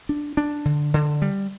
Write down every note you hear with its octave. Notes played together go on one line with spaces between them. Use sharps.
D4
D4
D3
D3
G3